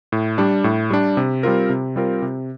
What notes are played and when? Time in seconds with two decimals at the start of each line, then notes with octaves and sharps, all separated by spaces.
0.12 A2
0.38 G3 D4
0.64 A2
0.90 G3 D4
1.17 C3
1.43 G3 C4 F4 A#4
1.70 C3
1.96 G3 C4 F4 A#4
2.22 C3